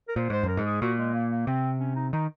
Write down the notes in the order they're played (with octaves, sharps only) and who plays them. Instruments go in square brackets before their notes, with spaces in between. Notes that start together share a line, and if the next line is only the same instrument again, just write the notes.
[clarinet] A#4
[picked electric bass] A#2 [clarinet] C5
[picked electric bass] G#2 [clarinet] C5
[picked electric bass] F#2
[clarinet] A#4
[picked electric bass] G#2
[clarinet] G#4
[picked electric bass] A#2 [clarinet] F#4
[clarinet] G#3
A#3
A#3
[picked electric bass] C3 [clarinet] C4
[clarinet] C#4
D#4
[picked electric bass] D#3 [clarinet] D#4